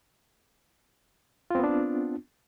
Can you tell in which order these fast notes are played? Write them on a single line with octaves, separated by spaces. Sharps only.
F4 C4 B3 D4